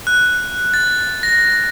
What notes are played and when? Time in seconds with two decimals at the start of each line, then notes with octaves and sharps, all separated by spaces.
0.07 F#6
0.74 A6
1.23 A#6